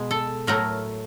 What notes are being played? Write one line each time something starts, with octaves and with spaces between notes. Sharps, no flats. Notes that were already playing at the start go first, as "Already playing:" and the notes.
Already playing: B2 G#3
A4
A2 F#3 A3 A#4